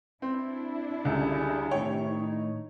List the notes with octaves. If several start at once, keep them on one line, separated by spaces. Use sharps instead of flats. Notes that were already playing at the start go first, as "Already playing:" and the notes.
C4 D4 E4
C#2 D3 G3 G#4
A2 C3 D#3 C#5 G5
D#4